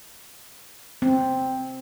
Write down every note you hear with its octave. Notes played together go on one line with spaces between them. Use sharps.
C4